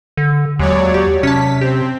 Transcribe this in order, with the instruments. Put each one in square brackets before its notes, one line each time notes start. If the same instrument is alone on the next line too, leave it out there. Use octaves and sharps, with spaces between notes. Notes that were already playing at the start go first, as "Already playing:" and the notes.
[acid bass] D3
[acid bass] D#2 [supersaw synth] F#3 C#5 D5 [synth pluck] G#3
[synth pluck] G4
[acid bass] C3 [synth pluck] C#4 A5 [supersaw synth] B6
[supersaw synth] C4 [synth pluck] G4